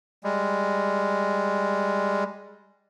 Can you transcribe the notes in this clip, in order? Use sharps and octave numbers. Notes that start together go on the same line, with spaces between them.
G3 G#3